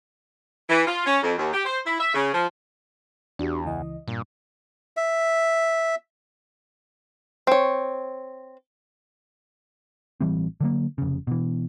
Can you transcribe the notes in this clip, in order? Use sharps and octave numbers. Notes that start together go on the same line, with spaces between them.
E3
F4
C#4
F2
D#2
G4
C5
E4
E5
C#3
F3
E2 D4 F#4 G4
C#2 E3 D#5
G2 A#2
E5
C4 C#5
A1 E3 G3 C4
D3 F#3 A#3
F1 C#3
B2 E3